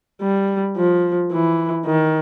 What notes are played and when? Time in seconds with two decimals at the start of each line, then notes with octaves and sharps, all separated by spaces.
0.22 G3
0.77 F3
1.32 E3
1.86 D#3